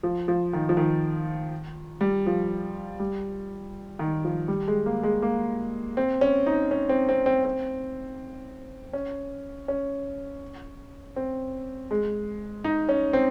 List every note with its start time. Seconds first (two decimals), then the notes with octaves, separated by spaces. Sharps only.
0.03 F3
0.28 F3
0.53 D#3
0.69 F3
0.77 D#3
2.01 G3
2.26 F3
3.00 G3
3.99 D#3
4.24 F3
4.48 G3
4.68 G#3
4.86 A#3
5.03 G#3
5.22 A#3
5.97 C4
6.21 C#4
6.46 D#4
6.71 C#4
6.89 C4
7.09 C4
7.26 C4
7.45 C4
8.93 C#4
9.68 C#4
11.16 C4
11.91 G#3
12.64 D#4
12.89 C#4
13.13 C4